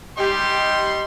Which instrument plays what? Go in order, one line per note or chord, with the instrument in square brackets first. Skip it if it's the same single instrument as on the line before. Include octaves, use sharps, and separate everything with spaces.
[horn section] G3 D#4 C6 [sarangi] G4